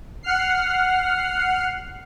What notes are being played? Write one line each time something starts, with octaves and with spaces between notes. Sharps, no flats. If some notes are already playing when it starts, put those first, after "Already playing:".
F#5 F6 C7